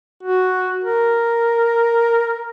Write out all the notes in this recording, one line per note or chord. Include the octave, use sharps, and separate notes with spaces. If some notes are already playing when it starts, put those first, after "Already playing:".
F#4
A#4